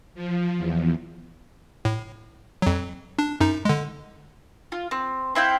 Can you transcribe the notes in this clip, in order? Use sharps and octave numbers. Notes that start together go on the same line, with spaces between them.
F3
E2
A2
F2 F#3
D4
F#2 D#4
D3 G#3
F4
C4
C4 E4 F5 G5